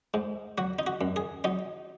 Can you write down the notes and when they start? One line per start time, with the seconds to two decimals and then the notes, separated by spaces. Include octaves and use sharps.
0.14 G#2
0.58 F#3 F#4
0.79 D#4
0.87 F#4
1.01 F#2
1.16 G#4
1.44 F#3 D#4